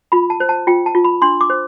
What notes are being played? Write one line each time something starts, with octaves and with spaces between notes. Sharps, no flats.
F4 B5
A5
C5
A5
F4 G5
A5
F4
B5
D4 C6
D6
C5